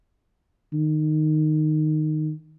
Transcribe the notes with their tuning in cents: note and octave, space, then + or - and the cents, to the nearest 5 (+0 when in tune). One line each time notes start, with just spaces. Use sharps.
D#3 -15